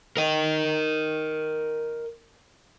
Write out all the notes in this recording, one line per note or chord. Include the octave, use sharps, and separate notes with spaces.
A#4 D#5